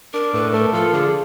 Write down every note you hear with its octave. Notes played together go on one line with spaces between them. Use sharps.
D4 A#4
A2 B4
A3 A#4
F3 A4
D3 G#4